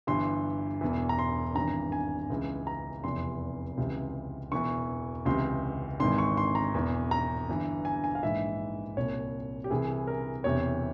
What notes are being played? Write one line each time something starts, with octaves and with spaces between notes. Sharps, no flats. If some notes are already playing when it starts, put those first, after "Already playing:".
G1 G2 E3 C6
E1 E2 E3
A#5
C6
G#1 G2 E3 A#5
G#5
C#2 C#3 E3
A#5
F1 E2 C3 E3 C6
C#2 C3 E3
E1 E2 E3 C#6
C#2 C3 E3 C6
G#1 G#2 E3 C6
C#6
C6
A#5
E1 E2 E3
A#5
G1 G2 E3
G#5
G#5
F5
A#1 G#2 E3 E5
C2 A#2 C#5
G4
C2 C3 E3 G#4
A#4
E1 E2 C3 E3 C#5